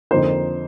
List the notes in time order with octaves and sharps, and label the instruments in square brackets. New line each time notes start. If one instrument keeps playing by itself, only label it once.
[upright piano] F2 D3 F3 A#3 D#4 C5